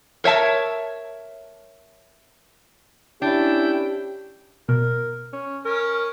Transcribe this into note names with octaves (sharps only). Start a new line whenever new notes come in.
A#4 C#5 E5 A5
C#4 D4 E4 G4 G5
B2 A#4
C#4
C#4 A#4